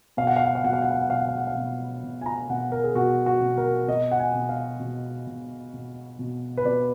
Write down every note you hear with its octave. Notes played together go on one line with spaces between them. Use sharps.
B2 F5
F#5
F5
F#5
F5
B2 F#5
F5
F#5
F5
F#5
B2 F5
F#5
F5
F#5
F5
B2
B2
G#5
A#5
B2 F#5
A#4
G#4
B2 F#4
F#4
B2
A#4
B2 D#5
F#5
G#5
B2
F5
B2
B2
B2
B2
B4
B2 D5